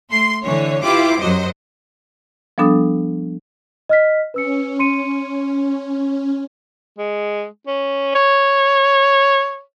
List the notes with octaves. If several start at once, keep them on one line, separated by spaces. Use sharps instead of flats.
A3 C6 C7
D3 E3 C#5
E4 F4 G4 B4 G5 D6
F#2 F#3 C5 D#5
F3 G3 B3 D4 A4 D#6
D#5 F6 B6
C#4 B4 E6 C#7
C6 C#7 D#7
G#3
C#4
C#5